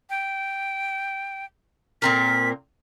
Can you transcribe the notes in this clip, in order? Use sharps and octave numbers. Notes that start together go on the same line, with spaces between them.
G5
A#2 C4 A#4 B6